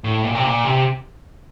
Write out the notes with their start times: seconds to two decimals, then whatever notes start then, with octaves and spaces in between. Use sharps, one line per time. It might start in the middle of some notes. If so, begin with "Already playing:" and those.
0.04 A2
0.24 A#2
0.35 C3
0.44 A#2
0.64 C3